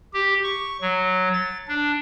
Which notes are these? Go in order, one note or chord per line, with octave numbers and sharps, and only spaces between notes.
G4
C#6
F#3
A6
D4